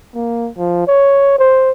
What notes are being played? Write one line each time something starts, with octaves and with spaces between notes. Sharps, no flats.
A#3
F3
C#5
C5